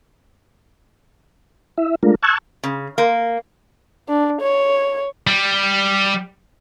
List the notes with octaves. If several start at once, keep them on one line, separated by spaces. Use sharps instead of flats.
E4 E5
G#3 A3 D4 F4 A#4
A5 C#6 E6 F#6 G#6
C#3
A#3
D4
C#5
G3